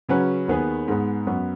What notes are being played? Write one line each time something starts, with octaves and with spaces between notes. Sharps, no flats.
C#3 F#3 C#4 B4
D#2 D#3 B3 G#4 B4
G#2 G#3 B3
F#2 F#3 B3